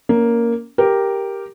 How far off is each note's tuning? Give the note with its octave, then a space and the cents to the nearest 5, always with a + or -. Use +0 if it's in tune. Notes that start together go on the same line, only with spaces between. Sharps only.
A#3 +0 C#4 +25
G4 +0 A#4 +0